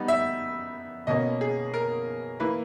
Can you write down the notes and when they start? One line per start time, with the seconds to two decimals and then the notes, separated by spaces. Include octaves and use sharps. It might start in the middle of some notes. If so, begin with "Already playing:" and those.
Already playing: G3 B3 D#4
0.08 E5
1.07 B2 A#3 C#4 D#5
1.41 G#4
1.74 A#4
2.40 E3 A#3 E4 B4